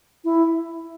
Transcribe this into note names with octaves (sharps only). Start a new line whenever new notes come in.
E4